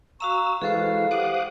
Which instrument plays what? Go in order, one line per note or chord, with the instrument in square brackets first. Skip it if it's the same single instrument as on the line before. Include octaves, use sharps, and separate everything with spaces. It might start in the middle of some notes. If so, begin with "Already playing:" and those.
[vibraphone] F#4 F5 A#5 [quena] C#6 [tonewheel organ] E6
[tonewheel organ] E3 G#3 F#4 [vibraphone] G#4 A4 C5 [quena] B4 [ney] F5
[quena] G4 [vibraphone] C5 F#5 [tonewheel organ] D6 D#6 F#6